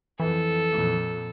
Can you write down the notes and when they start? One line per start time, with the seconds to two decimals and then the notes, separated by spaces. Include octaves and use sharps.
0.20 F2 E3 A4
0.71 F2 A#2